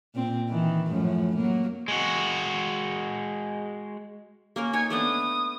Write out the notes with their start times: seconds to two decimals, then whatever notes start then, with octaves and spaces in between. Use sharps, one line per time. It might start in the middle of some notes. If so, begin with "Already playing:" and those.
0.15 A#2 C4
0.49 D#3 E3
0.90 F#2 A2 F3
1.36 F#3 A#3
1.88 G#3 F#4
4.56 A#3 C#4 A#4
4.73 D#4 A#4 C#5 G#5
4.90 A3 B3 D4 D#6